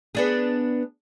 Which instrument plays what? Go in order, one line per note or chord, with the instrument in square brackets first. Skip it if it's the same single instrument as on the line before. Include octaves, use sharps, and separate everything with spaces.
[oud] B3 D4 G#4